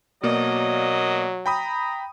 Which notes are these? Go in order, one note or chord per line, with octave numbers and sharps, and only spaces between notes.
B2 F#3 A#3 D5 D#5
G5 A#5 B5 D#6